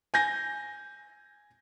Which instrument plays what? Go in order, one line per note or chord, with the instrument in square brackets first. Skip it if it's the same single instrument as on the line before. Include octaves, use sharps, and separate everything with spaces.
[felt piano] G#5 G6 A#6